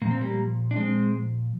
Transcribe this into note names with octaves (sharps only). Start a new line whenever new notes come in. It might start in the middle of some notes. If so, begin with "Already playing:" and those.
A#2 F3 A#3
C4
G3 A#3
D4
G#3 C4